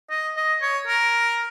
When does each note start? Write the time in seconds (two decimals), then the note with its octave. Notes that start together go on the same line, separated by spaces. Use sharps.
0.10 D#5
0.37 D#5
0.61 C#5
0.87 A#4